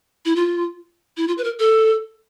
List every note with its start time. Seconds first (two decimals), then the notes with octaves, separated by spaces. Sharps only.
0.25 E4
0.36 F4
1.17 E4
1.28 F4
1.38 B4
1.44 A#4
1.59 A4